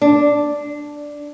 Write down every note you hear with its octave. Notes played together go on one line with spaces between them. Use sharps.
D4